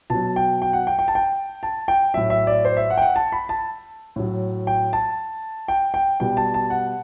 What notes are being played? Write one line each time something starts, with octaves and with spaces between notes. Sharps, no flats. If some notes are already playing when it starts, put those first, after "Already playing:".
B2 F#3 A5
G5
G5
F#5
G5
G5
A5
G5
A5
G5
A2 F#3 E5
E5
D5
C5
E5
F#5
G5
F#5
A5
B5
A5
A2 F#3
G5
A5
G5
G5
B2 G3 G5
A5
A5
F#5